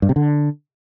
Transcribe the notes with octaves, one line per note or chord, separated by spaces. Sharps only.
G2
C3
D3